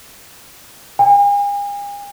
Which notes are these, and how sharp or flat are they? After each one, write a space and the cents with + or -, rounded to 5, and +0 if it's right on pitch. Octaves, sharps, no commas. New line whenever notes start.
G#5 -45